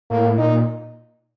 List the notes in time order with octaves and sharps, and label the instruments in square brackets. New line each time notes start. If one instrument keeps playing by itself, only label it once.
[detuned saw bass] A2 [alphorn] A#3
[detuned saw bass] A#2 [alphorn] D#4